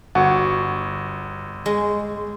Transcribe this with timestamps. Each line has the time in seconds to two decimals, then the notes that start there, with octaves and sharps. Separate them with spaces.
0.15 G1 F#4
1.66 G#3